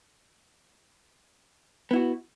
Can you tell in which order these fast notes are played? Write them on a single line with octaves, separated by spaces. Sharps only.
B3 E4 F#4